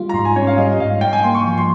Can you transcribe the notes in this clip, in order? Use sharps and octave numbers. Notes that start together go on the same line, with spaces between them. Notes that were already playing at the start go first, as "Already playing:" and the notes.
Already playing: G3 F4
A#5
G#2 C6
G#5
C#4 C#5
F5
G3 D#5
G#2 F5
G#2 G5
G#5
A#3 C6
C#6
F3
C6